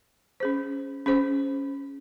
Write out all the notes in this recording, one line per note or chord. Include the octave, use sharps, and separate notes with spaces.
C#4 G#4 C5
C#4 G#4 C5